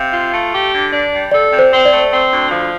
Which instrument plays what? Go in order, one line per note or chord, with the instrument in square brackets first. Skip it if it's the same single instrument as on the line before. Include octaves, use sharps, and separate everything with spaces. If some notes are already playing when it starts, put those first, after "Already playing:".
Already playing: [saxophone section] C3 [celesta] F5
[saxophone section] F4
A3
G4
D3
D4
G3
[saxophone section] A4 [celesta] D5
[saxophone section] C3
[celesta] C5
[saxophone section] C4
[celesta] D5
[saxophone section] A3
C4
D2
F3